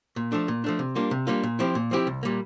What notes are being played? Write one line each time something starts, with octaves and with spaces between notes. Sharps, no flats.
A#2
F3 A3 D4
A#2
F3 A3 D4
C3
G3 A#3 D4 F4
C3
G3 A#3 D4 F4
A#2
F3 C4 E4 G4
A#2
F3 C4 E4 G4
C2
A#2 G3 A#3